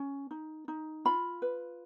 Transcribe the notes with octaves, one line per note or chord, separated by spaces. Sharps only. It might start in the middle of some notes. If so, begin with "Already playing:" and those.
Already playing: C#4
D#4
D#4
F4 B5
B4